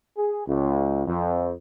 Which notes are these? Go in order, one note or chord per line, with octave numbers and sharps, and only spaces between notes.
G#4
C#2
F2